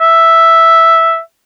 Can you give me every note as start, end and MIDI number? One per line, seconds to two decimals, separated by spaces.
0.01 1.19 76